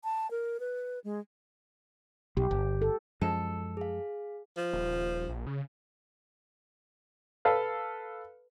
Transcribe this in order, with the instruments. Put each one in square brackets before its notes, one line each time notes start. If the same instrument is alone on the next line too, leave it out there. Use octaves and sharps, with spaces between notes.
[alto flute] A5
A#4
B4
G#3
[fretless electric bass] B1 [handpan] G4
[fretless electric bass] G1
[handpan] A4
[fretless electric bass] F#2 F3 G#3 [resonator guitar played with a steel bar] A4
[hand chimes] G#4 F5
[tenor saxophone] F3
[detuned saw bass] D#1
A#1
C#3
[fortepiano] A4 B4 F5